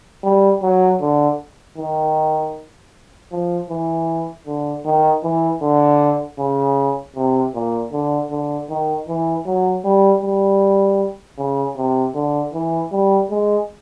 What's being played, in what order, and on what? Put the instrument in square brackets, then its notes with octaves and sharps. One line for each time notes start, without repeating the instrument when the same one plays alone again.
[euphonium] G3
F#3
D3
D#3
F3
E3
D3
D#3
E3
D3
C#3
C3
A#2
D3
D3
D#3
E3
F#3
G3
G3
C#3
C3
D3
E3
G3
G#3